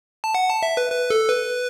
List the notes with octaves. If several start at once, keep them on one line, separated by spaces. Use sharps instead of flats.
A5
F#5
A5
E5
B4
B4
A4
B4